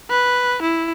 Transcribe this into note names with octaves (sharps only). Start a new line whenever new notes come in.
B4
E4